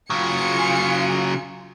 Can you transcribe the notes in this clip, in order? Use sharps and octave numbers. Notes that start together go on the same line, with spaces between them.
C#3 F#3 F4 G#5 C#7